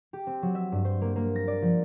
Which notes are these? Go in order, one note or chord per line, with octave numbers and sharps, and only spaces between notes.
G4
C4
F#3
E5
G2
C5
A#3
A#3
A#6
D5
F3